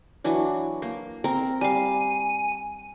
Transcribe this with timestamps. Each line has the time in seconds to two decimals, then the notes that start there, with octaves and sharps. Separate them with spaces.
0.24 E3 F#3 D4
0.82 A#3
1.24 C4 A#4 A#5
1.61 G3 F5 G#5